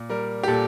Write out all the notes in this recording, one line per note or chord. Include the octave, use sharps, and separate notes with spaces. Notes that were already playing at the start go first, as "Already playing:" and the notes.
Already playing: A#2
G3 A#4
G4
A#2 A4